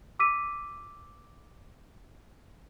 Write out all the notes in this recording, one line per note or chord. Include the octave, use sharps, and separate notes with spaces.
D6 E6 B6 D#7